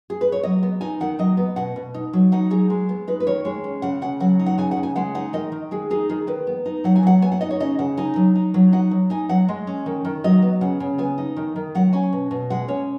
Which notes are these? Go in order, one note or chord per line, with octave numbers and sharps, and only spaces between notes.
G#4
B4
C#5
F#3 D#5
B3
D#4 G#5
D#3 F#5
F#3 D#5
B3
B2 F#5
B2
D#4
F#3
D#4 F#5
F#3 G#4
G#3
B3
D#4 B4
B4
D#3 C#5
G#3 C#5
C#4
C#3 F#5
C#3 F#5
F#3 F#5
D#4
F#5
C#3 G#5
F#5
C#3
G#5
G#3 F#5
D#4 F#5
D#3 D#5
D#3
G#3 G#4
D#4 G#4
D#3 G#4
D#3 B4
B3
D#4
F#3 F#5
G#5
F#3 F#5
B3 G#5
F#5
D#4 D#5
C#5
C#3 D#5
C#3 F#5
D#4 G#5
F#3
D#4
F#3
D#4 F#5
F#3
D#4 G#5
F#3 F#5
G#3 D#5
C#4
D#3
D#3
F#3 D#5
B3
C#3 F#5
C#3
B3 G#5
D#4
D#3
D#3
F#3 F#5
C#4 G#5
B2
B2
G#3 F#5
C#4 C#5